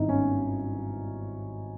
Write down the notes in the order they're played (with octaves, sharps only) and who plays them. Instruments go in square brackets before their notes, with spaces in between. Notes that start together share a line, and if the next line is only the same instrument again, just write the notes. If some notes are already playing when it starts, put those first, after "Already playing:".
Already playing: [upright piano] G#1 G2 D#3 D#4 E4
C#4